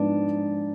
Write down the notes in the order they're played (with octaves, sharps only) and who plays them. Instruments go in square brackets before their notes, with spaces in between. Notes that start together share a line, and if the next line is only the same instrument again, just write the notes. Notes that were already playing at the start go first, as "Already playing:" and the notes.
Already playing: [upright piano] G#2 F3 B3 D#4 [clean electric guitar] D4